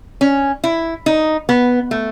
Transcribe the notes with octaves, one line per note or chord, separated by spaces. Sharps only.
C#4
E4
D#4
B3
A3